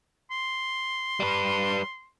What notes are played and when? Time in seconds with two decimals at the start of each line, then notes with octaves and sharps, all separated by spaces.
0.31 C6
1.20 G3 B4